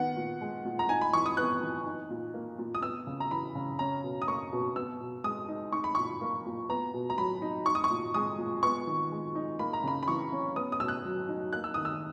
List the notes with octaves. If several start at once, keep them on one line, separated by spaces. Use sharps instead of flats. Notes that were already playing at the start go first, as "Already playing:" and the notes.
Already playing: D#3 B3 F#5
A#2
G#3
A#2
A#5
D#4 G#5
B5
E3 C#6
D#6
B3 F#6
E3
D#4
A#2
A#3
A#2
D#6
B3 E6
C#3
A#5
E3 B5
C#3
C#4 A#5
B2
D#6
A#3 C#6
B2
B3 E6
B2
G#3 D#6
D#4
D#4 C#6
B5
A#2 C#6
A#3
A#2
B3 A#5
B2
A#5
F#3 B5
D#4
D#4 C#6
D#6
C#6
A#2
G#3 D#6
A#2
B3 C#6
D#3
G#3
D#4
A#3 B5
A#5
C#3 B5
B5
E3 C#6
C#4
B3 D#6
D#6
B2 E6
F#6
F#3
D#4
A#3 F#6
E6
D#3 D#6
E6